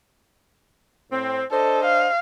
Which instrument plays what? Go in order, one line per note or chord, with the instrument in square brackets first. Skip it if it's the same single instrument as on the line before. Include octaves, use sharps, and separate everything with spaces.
[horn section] A2 C4
[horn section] D4 C5 D#5 [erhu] A4
[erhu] F5